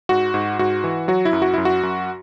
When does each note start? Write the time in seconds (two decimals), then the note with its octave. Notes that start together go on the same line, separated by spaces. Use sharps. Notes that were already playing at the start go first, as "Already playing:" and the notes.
0.09 G#2 F#4
0.34 G#2
0.59 G#2 F#4
0.84 E3
1.08 F#3 F#4
1.25 E4
1.33 F#2
1.42 F#4
1.54 F#2 E4
1.65 F#4
1.83 F#2